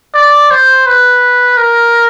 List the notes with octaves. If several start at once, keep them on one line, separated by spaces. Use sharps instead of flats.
D5
C5
B4
A#4